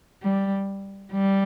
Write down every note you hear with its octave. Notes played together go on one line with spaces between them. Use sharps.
G3
G3